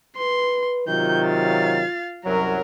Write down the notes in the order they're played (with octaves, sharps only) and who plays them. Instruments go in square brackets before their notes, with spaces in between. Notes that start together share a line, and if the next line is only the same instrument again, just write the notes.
[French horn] B4 [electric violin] C6
[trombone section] C3 D#3 F#3 [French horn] F4 [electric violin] G6
[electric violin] F5 A6
[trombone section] C2 F#2 F#3 [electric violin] A#4